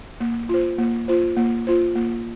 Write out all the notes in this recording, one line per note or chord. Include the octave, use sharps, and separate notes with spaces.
A#3
F4 C5
A#3
F4 C5
A#3
F4 C5
A#3